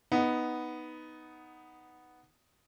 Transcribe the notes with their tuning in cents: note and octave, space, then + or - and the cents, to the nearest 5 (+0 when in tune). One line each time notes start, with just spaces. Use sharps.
B3 +0 D#4 +5